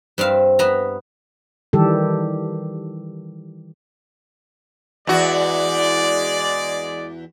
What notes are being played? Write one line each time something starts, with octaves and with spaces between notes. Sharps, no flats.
G2 C4 E5 F5
B3 E5 A#5
D#3 E3 G3 G4 A4
E2 G#3 F#4 D5